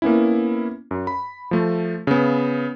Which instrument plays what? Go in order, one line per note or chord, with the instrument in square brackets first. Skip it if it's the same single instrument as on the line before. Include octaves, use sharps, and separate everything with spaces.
[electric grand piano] A#3 B3 C#4 E4
F#2
B5
F3 A3
C#3 B3